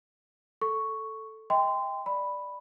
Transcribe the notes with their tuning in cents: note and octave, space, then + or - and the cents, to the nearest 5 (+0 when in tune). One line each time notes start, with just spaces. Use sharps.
A4 +0 C#6 +0
D#5 +40 G5 +20 C6 -25
D5 +0 B5 +0